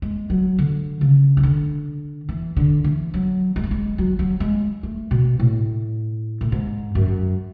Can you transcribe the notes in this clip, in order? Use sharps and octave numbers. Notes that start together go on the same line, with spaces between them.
G#3
F#3
D3
C#3
E3
D3
E3
D3
E3
F#3
G#3
A3
G#3
F#3
F#3
G#3
A3
B2
A2
A2
G#2
F#2